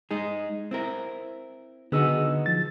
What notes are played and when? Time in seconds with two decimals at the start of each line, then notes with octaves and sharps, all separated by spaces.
0.11 G#3 D#4 G#4
0.71 C4 E4 A#4
1.92 D3 B3 D#4 F#4 G#4 E6
2.46 F3 A6